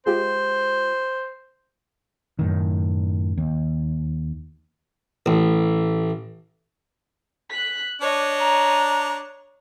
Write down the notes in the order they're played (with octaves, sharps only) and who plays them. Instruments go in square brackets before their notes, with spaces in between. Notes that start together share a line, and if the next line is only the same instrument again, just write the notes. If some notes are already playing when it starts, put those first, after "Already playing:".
[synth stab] G#3 F4 G4 [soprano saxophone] C5
[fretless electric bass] F#2 A2 D#3
D#2
[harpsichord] A1
[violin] F#6 B6
[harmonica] D4 [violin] C#5 D#5
[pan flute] A#5